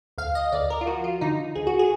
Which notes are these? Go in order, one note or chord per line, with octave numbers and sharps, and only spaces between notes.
D2 F5
D#5
D2 D5
A#4
F4
F3 F#4
F4
D3 D#4
D2 G#4
F#4
G#4